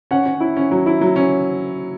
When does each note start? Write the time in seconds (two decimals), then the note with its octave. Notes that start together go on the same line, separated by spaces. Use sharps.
0.11 C#4 F#5
0.26 C#4
0.40 E4
0.57 C#4
0.71 F#3
0.86 E4
1.01 F#3
1.16 C#4